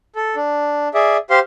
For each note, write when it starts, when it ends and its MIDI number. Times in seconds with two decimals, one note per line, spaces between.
0.16 0.36 69
0.36 0.88 62
0.94 1.17 68
0.94 1.17 74
0.94 1.17 76
1.30 1.39 67
1.30 1.39 72
1.30 1.39 77
1.30 1.39 84